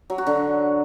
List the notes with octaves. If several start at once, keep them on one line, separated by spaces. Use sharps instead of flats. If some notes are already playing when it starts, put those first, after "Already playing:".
F#3
F#4
D3